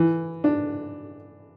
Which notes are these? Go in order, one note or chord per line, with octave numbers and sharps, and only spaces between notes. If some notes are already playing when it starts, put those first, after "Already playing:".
Already playing: E3
D4